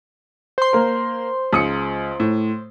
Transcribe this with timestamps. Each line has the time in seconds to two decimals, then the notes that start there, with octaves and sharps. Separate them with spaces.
0.58 C5 C6
0.73 A#3 A#4
1.53 C#2 D#6 C#7
2.20 A2